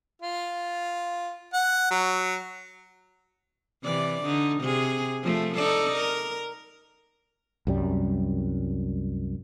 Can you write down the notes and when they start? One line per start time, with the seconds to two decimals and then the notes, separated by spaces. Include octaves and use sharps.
0.22 F4
1.54 F#5
1.91 F#3
3.84 C3 E3 D5
4.23 D3 D#4
4.61 C3 G#4
5.23 F3 A3
5.56 D#4 A4 D5
5.96 A#4
7.67 C2 F#2 G3